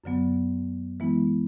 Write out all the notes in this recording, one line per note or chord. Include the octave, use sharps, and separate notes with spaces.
F#2 D3 F#3 B3
E3 G#3 B3 E4